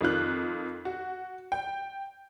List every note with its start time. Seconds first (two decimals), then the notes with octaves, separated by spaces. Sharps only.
0.01 F2 D#3 F4 F#6
0.85 F#4
1.52 G5